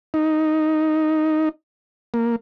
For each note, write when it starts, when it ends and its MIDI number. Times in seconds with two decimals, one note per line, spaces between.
0.14 1.49 63
2.14 2.36 58